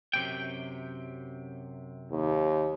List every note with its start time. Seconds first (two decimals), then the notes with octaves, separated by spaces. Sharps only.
0.14 F#2 C3 G5
2.11 D#2